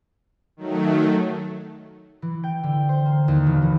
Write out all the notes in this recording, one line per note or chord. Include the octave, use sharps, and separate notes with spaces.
D#3 F#3 A3
E3
G5
D3
C5
A#3
D#2
E1
E3